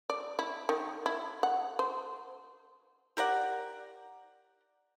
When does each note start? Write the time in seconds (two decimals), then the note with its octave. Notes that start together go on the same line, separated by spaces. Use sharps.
0.10 D5
0.39 E4
0.69 D#3
1.06 E4
1.43 F#5
1.79 C5
3.17 G4 A#4 D5 F#5